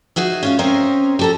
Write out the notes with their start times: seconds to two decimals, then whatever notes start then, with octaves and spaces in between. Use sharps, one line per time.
0.16 D#4 F#4 G#4 E5
0.43 C#4 F4 F5
0.59 C4 C#4 A#4 C5 C#5 D#5
1.19 G4 A4 A#5